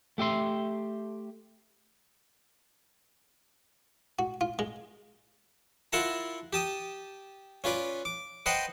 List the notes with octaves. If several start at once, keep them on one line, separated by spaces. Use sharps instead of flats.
A3 G4 E5 C6
F#4
F4
G#3
E4 F4 A#4 F#5 A5 A#5
G4 A5 D#6
C#4 F4 B4 D5
D6
B4 C5 D#5 F#5 G5 A#5